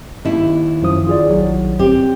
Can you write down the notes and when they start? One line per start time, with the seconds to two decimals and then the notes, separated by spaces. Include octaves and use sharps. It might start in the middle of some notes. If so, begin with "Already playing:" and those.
0.25 D#2 E4
0.82 F#2 F3 D#6
1.07 F4 G#4 D5
1.30 A#1 F#3
1.79 C4 G4